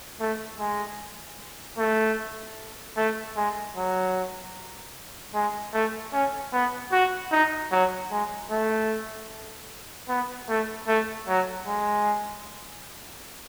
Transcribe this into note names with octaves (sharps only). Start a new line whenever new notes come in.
A3
G#3
A3
A3
G#3
F#3
G#3
A3
C#4
B3
F#4
D#4
F#3
G#3
A3
B3
A3
A3
F#3
G#3